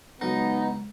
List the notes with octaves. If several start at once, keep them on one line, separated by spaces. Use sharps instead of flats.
C#2 F#3 B3 D#4 F#5